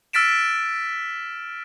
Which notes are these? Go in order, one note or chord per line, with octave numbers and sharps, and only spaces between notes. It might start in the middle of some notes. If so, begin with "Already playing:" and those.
E6 F6 A6 B6 D7 E7